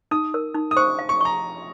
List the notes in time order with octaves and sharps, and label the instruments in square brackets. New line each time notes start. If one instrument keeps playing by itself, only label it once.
[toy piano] D#4 [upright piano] D#6
[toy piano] A#4
D#4
[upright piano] D#6
[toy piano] C5 [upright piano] C#6
[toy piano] F5
[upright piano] C#6
[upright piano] A#5 [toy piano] C#6